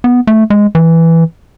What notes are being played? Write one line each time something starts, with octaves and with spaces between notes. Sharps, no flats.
B3
A3
G#3
E3